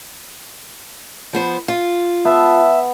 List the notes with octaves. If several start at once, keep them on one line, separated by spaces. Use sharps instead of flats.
F3 B3 C5
F4
B3 E5 A5